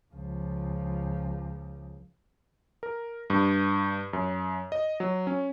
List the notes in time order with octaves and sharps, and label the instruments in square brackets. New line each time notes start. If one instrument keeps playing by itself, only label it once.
[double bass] C#2 F3
[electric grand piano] A#4
G2
F#2
D#5
F#3
C#4